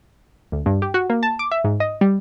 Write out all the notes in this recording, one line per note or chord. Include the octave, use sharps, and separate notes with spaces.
D2
G2
G4
F#4
A#3
A5
D6
E5
G#2
D#5
G3